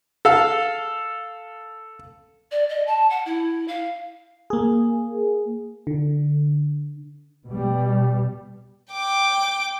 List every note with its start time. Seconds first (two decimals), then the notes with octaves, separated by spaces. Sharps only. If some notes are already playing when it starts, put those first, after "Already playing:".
0.25 A4 F5
2.51 D5
2.69 D#5
2.86 A5
3.10 F#5
3.26 E4
3.68 F5
4.50 A#3 G#4
5.87 D3
7.47 B2 G3
8.92 G5 D6